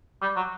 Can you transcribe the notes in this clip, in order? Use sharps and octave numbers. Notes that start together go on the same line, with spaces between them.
G3
F#3